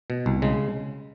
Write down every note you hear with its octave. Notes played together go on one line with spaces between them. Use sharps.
B2
C2
C#3 G#3